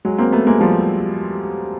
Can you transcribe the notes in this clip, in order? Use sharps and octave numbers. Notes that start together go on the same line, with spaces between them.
F#3 G#3
A#3 C4
A3 B3
G#3 A#3
F3 G3